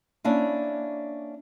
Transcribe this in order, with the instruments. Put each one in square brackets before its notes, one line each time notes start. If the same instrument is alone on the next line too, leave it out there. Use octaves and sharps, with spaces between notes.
[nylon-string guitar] A#3 C#4 D4 E4